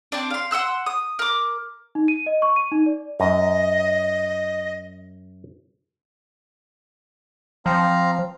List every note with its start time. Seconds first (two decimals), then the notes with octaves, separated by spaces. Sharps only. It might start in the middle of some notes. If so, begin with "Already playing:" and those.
0.12 C4 D4
0.30 F5 C6
0.51 F#5 C6 E6 F#6
0.86 D#6
1.19 A#4 D6
1.95 D#4
2.08 D#7
2.26 D#5
2.42 C#6
2.56 D#7
2.72 D#4
2.86 D5
3.20 F#2 D#5
7.66 F3 C4 F5 A#5